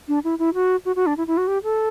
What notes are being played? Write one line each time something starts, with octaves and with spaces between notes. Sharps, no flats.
D4
E4
E4
F#4
F#4
F#4
D4
E4
E4
F#4
G4
A4